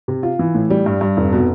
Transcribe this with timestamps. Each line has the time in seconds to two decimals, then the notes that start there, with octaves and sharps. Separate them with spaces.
0.08 C3
0.23 F4
0.39 E3
0.55 A2
0.70 G3
0.86 G2
1.01 G2
1.17 F1
1.33 B2